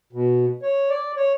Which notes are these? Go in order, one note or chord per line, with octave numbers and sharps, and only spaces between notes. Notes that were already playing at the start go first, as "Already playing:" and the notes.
B2
C#5
D5
C#5